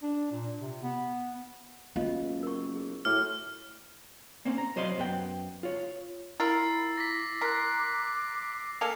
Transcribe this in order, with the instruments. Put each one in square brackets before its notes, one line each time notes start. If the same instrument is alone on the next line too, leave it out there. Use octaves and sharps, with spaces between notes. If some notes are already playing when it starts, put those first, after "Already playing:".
[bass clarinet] D4
A#2
C3
B3
[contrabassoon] F#1 [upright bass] B3 [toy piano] F4 D#5 F5
[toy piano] A#4 C#6
G#4
[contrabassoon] A2 [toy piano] F#4 C#5 D6 [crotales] F6
[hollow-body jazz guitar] A#3 C4 C#4
A#5
C2 F#3 C5 D#5 F5 C6
F#2 B3 G5
F4 C#5
[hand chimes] E4 [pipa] F4 A#4 [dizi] B5 [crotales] E6 A6 C7
[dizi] D6 [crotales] A#6 B6
[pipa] A#4 [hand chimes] C6 F#6 [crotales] B6 C7
[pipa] A#3 A4 F5 [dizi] G#5 [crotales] F7